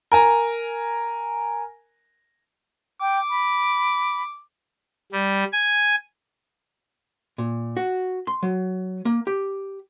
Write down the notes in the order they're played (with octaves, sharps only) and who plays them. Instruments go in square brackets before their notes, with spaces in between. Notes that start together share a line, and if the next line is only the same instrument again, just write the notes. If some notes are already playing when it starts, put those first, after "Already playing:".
[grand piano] A#4 G#5 A#5
[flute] G5 [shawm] D6
[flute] B5
[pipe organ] G3
G#5
[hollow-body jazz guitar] A#2
F#4
C6
F#3
A#3
G4